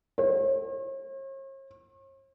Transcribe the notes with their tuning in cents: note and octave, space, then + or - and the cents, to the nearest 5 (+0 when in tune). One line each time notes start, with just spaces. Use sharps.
C#5 -45